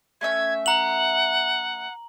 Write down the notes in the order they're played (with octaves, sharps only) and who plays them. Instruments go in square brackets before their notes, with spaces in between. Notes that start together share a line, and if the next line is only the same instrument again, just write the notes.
[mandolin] A3 C#4 E5 [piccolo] G#6
[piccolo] F#5 [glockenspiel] A#5 F#7